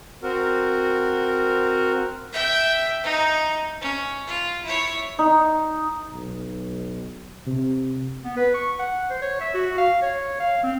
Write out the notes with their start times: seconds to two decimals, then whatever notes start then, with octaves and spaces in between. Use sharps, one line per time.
0.23 C4 F#4 A#4
2.33 E5 G5
3.04 D#4
3.81 C#4
4.27 F4
4.64 E4 C#5
5.19 D#4
6.13 B1
7.47 C3
8.24 B3
8.36 B4
8.54 C#6
8.79 F#5
9.10 C5
9.22 C#5
9.40 E5
9.54 F#4
9.78 F5
10.02 C#5
10.40 F5
10.63 C4